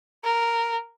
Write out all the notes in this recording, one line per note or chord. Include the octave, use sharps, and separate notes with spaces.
A#4